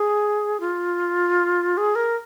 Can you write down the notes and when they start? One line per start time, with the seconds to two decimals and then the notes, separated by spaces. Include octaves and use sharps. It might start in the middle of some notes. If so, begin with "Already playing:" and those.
Already playing: G#4
0.60 F4
1.77 G#4
1.95 A#4